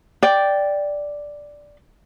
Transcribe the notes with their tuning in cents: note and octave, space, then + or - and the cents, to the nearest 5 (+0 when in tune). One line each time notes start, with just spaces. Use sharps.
D5 +0 G5 +0